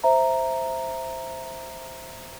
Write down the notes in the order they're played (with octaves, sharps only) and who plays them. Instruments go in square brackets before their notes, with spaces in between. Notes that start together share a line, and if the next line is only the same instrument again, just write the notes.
[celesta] C5 E5 A#5